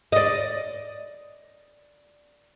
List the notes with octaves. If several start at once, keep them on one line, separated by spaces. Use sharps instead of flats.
D5 D#5